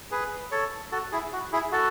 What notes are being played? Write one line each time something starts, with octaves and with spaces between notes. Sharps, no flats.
G#4 B4
A4 C#5
F#4 A4
E4 G#4
F#4
E4 G#4
F#4 A4